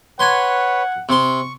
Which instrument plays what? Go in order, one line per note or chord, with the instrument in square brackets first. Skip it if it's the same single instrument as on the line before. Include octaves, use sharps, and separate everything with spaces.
[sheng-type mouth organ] B4 C#5 [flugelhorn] F#5 [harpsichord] G#5 C6
[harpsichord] C3 C6 [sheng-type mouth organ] C#6